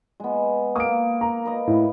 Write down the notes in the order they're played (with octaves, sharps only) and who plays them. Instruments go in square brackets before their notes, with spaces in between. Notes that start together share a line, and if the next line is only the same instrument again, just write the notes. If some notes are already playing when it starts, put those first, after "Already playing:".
[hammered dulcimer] G#3 B3
[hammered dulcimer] A#3 [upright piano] D#6 D7
[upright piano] A#5
[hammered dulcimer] B4 D#5
[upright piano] A2